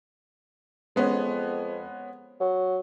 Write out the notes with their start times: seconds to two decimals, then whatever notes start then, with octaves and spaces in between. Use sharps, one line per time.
0.96 F2 G#3 B3 C#4
2.40 F#3